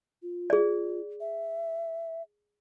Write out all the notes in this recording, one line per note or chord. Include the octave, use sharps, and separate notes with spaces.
F4
G#4 D5
E5